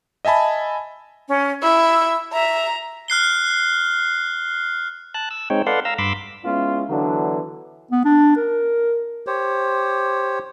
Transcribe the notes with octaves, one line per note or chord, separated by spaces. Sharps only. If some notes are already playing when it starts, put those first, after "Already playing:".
D#5 E5 G#5 A5 B5
C#4
E4 E6
E5 A#5
F6 F#6 C7 G7
A5 F#6
E6
G#3 C4 D#4 C#5 G5
A4 B4 D5 F5 F#5 C6
F5 A#5 E6
G2 B5 C6 D6 E6
G#3 B3 C#4 E4 F4
D3 E3 F#3 B3 D4
B3
D4
A#4
G4 C5 C#5